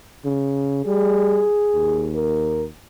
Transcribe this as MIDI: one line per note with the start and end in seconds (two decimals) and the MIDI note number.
0.25 0.82 49
0.86 1.44 55
0.86 2.09 68
1.74 2.70 39
2.15 2.64 70